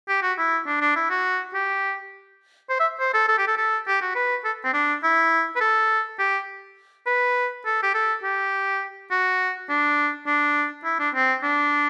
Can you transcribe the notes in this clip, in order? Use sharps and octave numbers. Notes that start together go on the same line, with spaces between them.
G4
F#4
E4
D4
D4
E4
F#4
G4
C5
E5
C5
A4
A4
G4
A4
A4
G4
F#4
B4
A4
C4
D4
E4
B4
A4
G4
B4
A4
G4
A4
G4
F#4
D4
D4
E4
D4
C4
D4